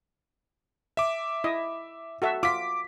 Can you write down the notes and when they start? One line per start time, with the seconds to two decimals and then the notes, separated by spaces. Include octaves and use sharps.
0.97 E5 D6
1.44 E4 D#5
2.22 F#4 A4 E5
2.43 F4 D6 B6